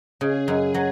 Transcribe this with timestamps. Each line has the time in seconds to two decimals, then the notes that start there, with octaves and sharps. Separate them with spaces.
0.21 C#3 G#4
0.48 F#2
0.74 F#3